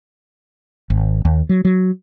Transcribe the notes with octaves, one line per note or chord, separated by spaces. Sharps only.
G#1
D#2
F#3
F#3